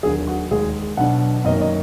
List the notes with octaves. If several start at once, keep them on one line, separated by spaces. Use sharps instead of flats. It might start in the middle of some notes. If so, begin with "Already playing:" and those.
D#2 D3 F#3 G#4
F#4
D#2 D#3 G#3 G#4
B2 F#3 D4 F#5
F#2 D#3 A#3 D#5
D#5